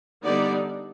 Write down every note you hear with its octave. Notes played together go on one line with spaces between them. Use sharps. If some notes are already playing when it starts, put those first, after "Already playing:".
D3 G3 B3 D#4 D5